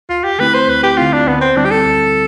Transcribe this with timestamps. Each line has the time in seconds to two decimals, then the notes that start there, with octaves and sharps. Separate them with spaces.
0.09 D2 F4
0.24 G4
0.39 D3 A3 C4 E4 B4
0.54 C5
0.69 D2 B4
0.83 G4
0.97 D3 A3 C4 E4 F4
1.13 D4
1.27 D2 B3
1.41 C4
1.56 D3 G3 C4 D4 E4
1.65 G4
1.71 A4
1.85 D2